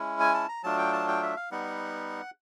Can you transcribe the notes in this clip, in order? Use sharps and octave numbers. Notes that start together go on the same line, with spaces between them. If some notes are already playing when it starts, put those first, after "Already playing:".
Already playing: G#3 C#4 E4
G#5
A5
A#5
F#3 A3 D4 F4 A5
G5
A5
G5
E5
F5
G3 B3 D#4 F#5